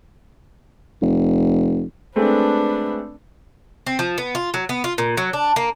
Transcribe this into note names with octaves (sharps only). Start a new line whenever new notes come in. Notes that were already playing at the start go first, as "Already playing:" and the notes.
F1
G#3 A3 C4 D4 B4
C4
F3
B3
F4
F#3
B3
F4
A#2
F#3
D4
A#3